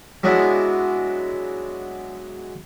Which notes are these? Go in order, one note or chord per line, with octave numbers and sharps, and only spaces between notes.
F#3 G#3 B3 D4 E4